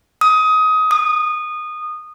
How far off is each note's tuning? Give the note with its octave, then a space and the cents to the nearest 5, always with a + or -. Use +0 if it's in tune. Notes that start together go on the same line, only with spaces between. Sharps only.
D#6 +20
D#6 -20